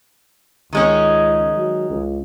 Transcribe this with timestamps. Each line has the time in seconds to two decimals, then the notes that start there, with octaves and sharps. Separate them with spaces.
0.73 C#2 D#3 G#3 C#4
1.57 F#3
1.90 C#2